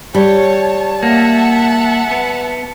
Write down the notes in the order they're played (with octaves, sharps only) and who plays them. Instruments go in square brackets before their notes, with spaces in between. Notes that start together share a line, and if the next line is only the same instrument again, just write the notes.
[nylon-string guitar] G3 [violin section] C#5 [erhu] A5
[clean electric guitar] A#3 [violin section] E5 F#5
[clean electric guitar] B3